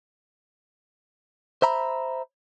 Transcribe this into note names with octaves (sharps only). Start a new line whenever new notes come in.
C5 E5 A#5 B5